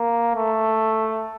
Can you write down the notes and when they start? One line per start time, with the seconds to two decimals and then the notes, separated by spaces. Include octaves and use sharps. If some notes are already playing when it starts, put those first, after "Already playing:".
Already playing: A#3
0.35 A3